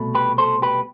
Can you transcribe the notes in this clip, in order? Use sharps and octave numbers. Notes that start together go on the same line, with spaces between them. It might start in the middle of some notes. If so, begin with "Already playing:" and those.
Already playing: C2 B2 A3
G4 B4
A4 C5
G4 B4